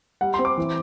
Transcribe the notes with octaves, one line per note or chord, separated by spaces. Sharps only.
G3 F#5
C6
C4
D6
E3